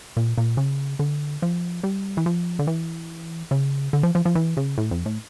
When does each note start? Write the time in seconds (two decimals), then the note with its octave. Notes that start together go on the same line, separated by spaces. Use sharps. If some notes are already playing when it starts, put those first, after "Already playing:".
0.17 A#2
0.38 A#2
0.57 C#3
0.99 D3
1.42 F3
1.84 G3
2.17 E3
2.26 F3
2.59 D3
2.67 E3
3.51 C#3
3.93 D3
4.03 F3
4.15 F3
4.25 F3
4.35 E3
4.57 C#3
4.78 A2
4.91 F2
5.06 A2